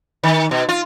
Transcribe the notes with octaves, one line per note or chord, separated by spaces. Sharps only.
D#3
B2
F4